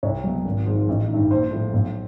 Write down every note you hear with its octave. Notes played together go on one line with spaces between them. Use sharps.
C2 C#5
B2 F#3
G#1
G#2 F3
A1
G2 D#3
A#1 C5
A2 F3
B1